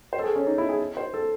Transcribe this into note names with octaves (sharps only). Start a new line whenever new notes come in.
C5
A4
G#4
C#4
D#4
E4
G#4
C5
A4